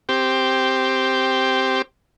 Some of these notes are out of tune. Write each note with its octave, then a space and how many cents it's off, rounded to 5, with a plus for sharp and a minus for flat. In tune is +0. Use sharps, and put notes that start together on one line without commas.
C4 +0 G4 +0